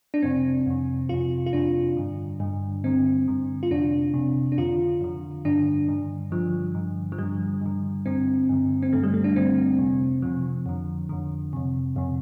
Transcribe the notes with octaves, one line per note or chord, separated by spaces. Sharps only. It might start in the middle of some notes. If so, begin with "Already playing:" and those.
D4
F2 C3 C4
F2 C3
F2 C3 F4
F4
F2 C3 D4
G2 D3
G2 D3
G2 D3 C4
G2 D3
F4
F2 C3 D4
F2 C3
D4
F2 D3 F4
F2 D3
G2 D3 D4
G2 D3
G2 D3 F3
G2 D3
F3
G2 D3 G3
G2 D3
G2 D3 C4
G2 D3
C4
G2 D3 A3
G3
A3
D4
G2 D3 C4
F2 C3
F2 C3 F3
F2 D3
F2 D3
F2 C3
F2 C3